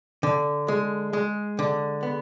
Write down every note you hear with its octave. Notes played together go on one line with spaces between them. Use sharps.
D3
G#3
G#3
D3
B3